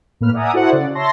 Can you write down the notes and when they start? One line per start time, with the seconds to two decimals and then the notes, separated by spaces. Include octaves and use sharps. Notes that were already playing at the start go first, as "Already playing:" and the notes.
0.21 A2 A#3 B4 F6
0.34 D5 E5 F#5 G#5 A#5 D#6
0.53 E4 F#4 A4 C5 F#5
0.71 C#3 D5
0.95 C#5 E5 A5 C6 A#6